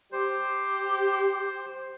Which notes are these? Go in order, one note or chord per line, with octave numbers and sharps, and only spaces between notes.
G4 C5